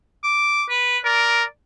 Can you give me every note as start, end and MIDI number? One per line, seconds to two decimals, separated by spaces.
0.23 0.64 86
0.69 0.98 71
1.05 1.44 70
1.05 1.45 74